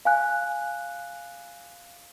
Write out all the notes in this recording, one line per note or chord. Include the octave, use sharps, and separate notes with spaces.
F5 G#5 F#6